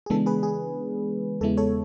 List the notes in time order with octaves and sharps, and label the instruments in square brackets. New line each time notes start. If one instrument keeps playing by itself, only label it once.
[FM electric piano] G#4
C#3 E3 G#3 B3 D4 A4
G#4 B4
G#4
E2 C#3 G#3 B3 E4 A4
A4 C#5